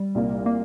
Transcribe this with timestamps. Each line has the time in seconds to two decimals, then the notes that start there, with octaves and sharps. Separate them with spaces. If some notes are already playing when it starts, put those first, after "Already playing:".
Already playing: G3
0.15 C2 A#2 A#3
0.46 A#3